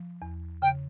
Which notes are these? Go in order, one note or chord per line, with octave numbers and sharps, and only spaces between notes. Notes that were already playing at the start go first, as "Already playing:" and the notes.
Already playing: F3
E2
C#3 G5